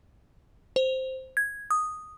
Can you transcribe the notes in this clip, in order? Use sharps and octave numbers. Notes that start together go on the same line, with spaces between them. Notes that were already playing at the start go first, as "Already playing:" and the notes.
C5
G#6
D#6